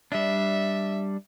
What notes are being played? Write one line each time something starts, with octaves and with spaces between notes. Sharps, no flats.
G3 D4 E5